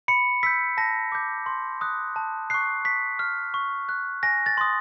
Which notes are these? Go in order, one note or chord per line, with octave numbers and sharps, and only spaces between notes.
B5 C#7
E6 G6 B6
A5 A#6
D6 G6
C6
D#6 F#6
A5
C#6 F#6 C7
C#6 B6
F6
C#6
F#6
G#5 A#6
A6
C6 D#6